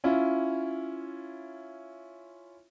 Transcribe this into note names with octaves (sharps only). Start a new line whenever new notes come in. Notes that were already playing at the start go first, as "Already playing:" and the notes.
C#4 E4 F4